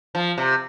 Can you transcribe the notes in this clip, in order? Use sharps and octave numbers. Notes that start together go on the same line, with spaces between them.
F3
C3